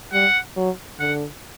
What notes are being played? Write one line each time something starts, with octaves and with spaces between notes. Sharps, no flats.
G3 F#5
F#3
D3 F#5